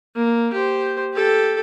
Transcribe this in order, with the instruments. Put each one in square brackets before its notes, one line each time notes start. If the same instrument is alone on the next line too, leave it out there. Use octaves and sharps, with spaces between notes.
[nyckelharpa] A#3
G4 C5
G4 A4